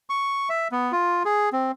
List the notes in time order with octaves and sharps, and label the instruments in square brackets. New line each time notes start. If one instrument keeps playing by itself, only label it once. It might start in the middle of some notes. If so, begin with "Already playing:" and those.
[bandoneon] C#6
E5
B3
F4
G#4
C4